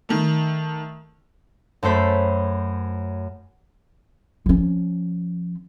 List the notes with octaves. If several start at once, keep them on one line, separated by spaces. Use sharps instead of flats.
D#3 A3
F#2 A3 A4 C5 B5
F3 C#4